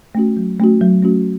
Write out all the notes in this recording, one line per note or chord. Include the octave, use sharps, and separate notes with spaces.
A3 C#4 F#4
F#3
A3 C#4 F#4
F#3
A3 C#4 F#4